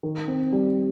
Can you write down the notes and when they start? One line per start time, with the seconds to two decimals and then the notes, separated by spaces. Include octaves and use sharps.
0.03 D#3
0.28 C4
0.52 G3